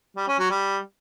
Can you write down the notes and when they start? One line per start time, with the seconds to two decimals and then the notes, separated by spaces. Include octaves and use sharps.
0.17 G3
0.28 C#4
0.39 F#3
0.50 G3